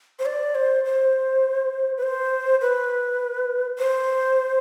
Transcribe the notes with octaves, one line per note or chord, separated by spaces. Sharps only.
C5
D5
C5
C5
B4
C5
B4
C5